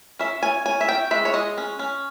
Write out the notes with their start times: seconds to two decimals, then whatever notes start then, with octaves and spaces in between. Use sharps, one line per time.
0.19 C#4 E5
0.43 C#4 G#5
0.66 C#4 G#5
0.81 E5
0.88 C#4 G5
1.11 G#3 E5
1.25 C#5
1.34 G#3 D#5
1.58 C#4
1.79 C#4